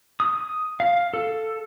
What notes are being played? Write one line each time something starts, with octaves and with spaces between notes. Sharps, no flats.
D#6
F5
A4